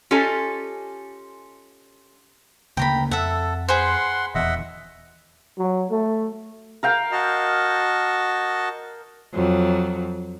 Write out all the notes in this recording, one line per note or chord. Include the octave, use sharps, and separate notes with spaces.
C#4 F4 G4 A4 D#5 G#5
D2 C#3 A#3 G5 A#5 B5
F2 A4 E5 F#5
G#4 B4 C5 F#5 C6
D#1 E2 D#5 E5 F#5
F#3
A3
A#4 F5 G5
F#4 D#5 A5
F2 F#3